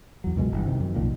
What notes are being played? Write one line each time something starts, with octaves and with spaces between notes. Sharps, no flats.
E2 F#3
C#2 F#2 B2 G#3
G1 E3 G3
C3 D#3
F#2
B1 A#2 D#3 F3